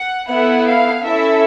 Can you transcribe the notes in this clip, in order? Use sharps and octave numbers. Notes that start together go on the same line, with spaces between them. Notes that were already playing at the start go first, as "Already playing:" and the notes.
Already playing: F#5
B3 E4 A4 F#5
F5
C#4 E4 A4 E5